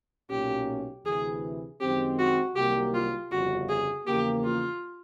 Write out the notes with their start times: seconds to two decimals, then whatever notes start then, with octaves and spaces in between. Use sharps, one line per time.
0.30 B1 A#2 F#3 A#3 C#4 G4
1.05 D2 C3 E3 G#4
1.81 F#2 D#3 G#3 C4 G4
2.19 F#4
2.56 C2 C3 D#3 F#3 A#3 G4
2.94 F4
3.31 G1 F2 C#3 F#4
3.69 G#4
4.07 E2 C#3 F3 A#3 G4
4.44 F4